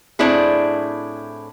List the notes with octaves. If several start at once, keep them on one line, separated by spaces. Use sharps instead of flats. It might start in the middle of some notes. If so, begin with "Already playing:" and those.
A2 C4 D4 E4 G#4